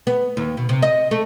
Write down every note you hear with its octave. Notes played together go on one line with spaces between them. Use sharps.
B3
D#2
B2
C3
D#5
A3